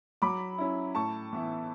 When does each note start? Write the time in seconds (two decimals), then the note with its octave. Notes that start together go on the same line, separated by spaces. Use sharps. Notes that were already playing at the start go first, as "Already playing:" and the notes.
0.22 F#3 B5 D6
0.58 C#4 E4
0.95 A2 A5 C#6
1.33 E3 B3 E4